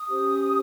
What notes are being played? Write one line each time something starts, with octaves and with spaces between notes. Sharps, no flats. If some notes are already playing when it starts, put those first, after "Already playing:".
Already playing: D#6
C#4 G4 C5